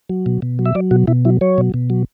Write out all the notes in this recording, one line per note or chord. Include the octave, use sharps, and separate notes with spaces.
F#3
B2
B2
F#3
E5
F#3 D5
B2 F#4
B2 E4
F#3 E4
F#3 C#5
B2
B2
F#3